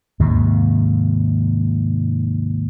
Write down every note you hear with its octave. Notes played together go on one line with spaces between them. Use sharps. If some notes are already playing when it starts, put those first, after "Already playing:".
D#2 G#2 C3